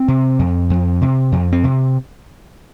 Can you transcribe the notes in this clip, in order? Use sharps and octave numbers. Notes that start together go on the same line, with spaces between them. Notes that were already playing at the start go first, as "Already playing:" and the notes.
Already playing: C4
C3
F2
F2
C3
F2
C4
C3